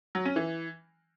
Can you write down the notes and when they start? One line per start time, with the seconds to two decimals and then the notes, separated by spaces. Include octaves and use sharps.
0.15 F#3
0.25 C#4
0.36 E3